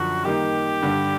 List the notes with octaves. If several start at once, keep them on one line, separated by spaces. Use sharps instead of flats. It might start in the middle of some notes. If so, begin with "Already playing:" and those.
Already playing: F#2 D3 F3 F#4
D#3 G3 A#3 D#4 G4
G2 D3 G3